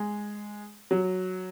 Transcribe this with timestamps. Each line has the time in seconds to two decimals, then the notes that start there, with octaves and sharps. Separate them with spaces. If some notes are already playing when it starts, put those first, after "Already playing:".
Already playing: G#3
0.91 F#3